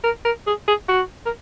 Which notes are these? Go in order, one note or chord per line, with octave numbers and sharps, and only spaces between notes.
A#4
A#4
G#4
G#4
F#4
A#4